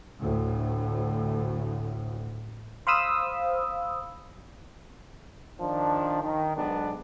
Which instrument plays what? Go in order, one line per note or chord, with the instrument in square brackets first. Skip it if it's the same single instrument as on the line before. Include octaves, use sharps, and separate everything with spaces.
[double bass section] D2 A2
[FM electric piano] C5 F5 B5 D#6 E6
[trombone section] D#3 F3 D4
D#3
B1 G#2 B3 D4